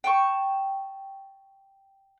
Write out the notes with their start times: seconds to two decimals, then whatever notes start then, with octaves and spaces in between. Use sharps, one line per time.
0.04 G5 A5 C#6